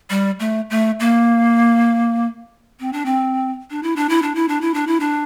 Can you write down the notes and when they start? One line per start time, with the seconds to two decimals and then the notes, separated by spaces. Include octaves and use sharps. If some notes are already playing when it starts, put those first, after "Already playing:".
0.10 G3
0.40 A3
0.70 A3
1.00 A#3
2.80 C4
2.93 D4
3.05 C4
3.70 D4
3.83 E4
3.96 D4
4.09 E4
4.22 D4
4.35 E4
4.48 D4
4.61 E4
4.74 D4
4.87 E4
5.00 D4